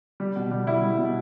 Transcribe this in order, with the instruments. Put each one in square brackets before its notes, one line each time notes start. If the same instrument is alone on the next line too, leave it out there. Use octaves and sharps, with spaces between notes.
[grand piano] G3
B2
G3
G3 E4
G3
B2